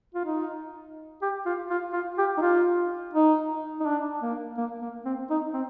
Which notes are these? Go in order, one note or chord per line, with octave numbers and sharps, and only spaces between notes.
F4
D#4
G4
F4
F4
F4
G4
D#4
F4
D#4
D#4
D4
A#3
A#3
A#3
C4
D#4
C4